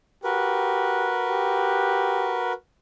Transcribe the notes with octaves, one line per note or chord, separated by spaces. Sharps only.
F#4 G4 A#4 B4
G4